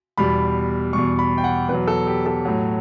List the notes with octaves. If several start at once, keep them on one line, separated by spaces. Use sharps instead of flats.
E2 B2 G3 B5
E2 B2 G3 C#6
B5
G5
F#5
E2 B2 F#3 B4
A4
G4
A4
A2 F#3